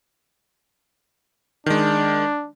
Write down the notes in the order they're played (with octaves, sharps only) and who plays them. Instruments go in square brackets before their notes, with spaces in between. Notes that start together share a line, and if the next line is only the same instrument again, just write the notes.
[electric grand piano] D#3 G#3 [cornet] D4